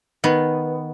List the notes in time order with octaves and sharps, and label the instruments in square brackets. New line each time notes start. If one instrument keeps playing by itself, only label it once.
[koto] D#3 B3